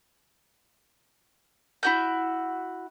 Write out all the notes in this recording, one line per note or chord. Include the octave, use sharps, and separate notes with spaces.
E4 F#4 G6